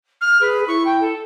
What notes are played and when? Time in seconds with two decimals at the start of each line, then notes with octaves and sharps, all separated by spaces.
0.21 F6
0.41 G#4 B4
0.68 E4 C#6
0.85 G5
1.00 A4